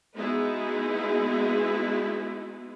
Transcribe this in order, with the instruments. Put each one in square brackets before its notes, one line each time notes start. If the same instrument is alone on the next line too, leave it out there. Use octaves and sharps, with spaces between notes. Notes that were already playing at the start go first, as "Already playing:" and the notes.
[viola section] G#3 B3 D#4 E4 F#4 G#4